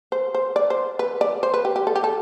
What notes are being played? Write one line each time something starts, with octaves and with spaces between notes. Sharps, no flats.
C5
C5
D5
C5
B4
D5
C5
B4
G4
G4
A4
G4
A4